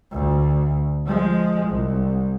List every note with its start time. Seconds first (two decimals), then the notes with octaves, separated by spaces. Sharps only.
0.12 D2
1.06 F3 G#3
1.67 C2